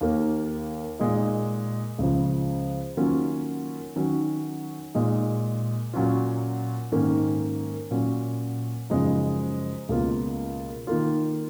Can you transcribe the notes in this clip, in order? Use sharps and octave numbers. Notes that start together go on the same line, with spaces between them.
D#2 D#3 A#3
A#2 G#3 D#4
C#2 C#3 F3
D#3 F#3 A#3 C#4 F4
D#3 F#3 C#4 F#4
A#2 G#3 D#4
A#2 F#3 C#4 F4
G#2 D#3 A#3 C#4
A#2 F#3 C#4
F#2 C#3 F3 G#3 D#4
C#2 B2 A#3 F4
D#3 A#3 F4